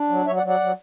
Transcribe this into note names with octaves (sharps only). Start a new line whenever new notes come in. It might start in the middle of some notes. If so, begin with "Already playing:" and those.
Already playing: D4
F#3
F#3 C#5 E5
D5 F#5
F#3
D5 F#5
F#3